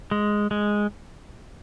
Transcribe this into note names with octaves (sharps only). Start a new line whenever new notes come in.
G#3
G#3